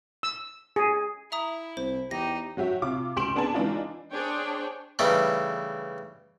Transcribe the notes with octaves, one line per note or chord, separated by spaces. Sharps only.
E6
G#4
E4 E5 A#5 D#6
C2 C5
E2 D#4 G4 A#6
F#3 F#4 G4 E5
C3 F4 D6
C#2 G4 C6 D7 E7 F#7
B3 D4 G#4 G#5 A5
E3 G#3 D4 D#4 F4
D4 G#4 C5 C#5 G5
C#3 E3 G3 A3 D#4